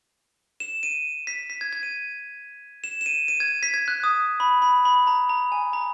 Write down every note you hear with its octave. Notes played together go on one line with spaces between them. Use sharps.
E7
D#7
B6
B6
G#6
G#6
D#7
E7
E7
D#7
D#7
G#6
B6
G#6
F#6
D#6
B5
B5
B5
A#5
A#5
G#5
A#5